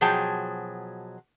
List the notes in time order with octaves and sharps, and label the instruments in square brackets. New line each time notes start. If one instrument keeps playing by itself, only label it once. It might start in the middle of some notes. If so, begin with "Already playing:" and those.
[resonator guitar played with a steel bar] B2 F3 F#3 G#4 G5 A5